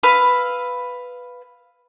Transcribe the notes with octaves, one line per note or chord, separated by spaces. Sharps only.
B4 F5 E6